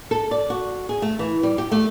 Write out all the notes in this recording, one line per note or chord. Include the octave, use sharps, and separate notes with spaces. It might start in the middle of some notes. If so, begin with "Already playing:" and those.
A4
D5
F#4
G#4
A3
E3
G3
G4
A3